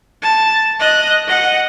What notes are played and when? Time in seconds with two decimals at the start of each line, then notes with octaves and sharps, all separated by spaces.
0.22 A5
0.80 D#5 F#6
1.28 D#5 F#5